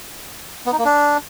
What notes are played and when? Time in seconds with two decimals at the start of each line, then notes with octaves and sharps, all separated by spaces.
0.66 B3
0.72 D#4
0.79 A#3
0.85 D4